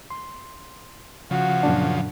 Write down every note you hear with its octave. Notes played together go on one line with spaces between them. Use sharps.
C6
C#3 F3 F#4
F#2 A#2 D4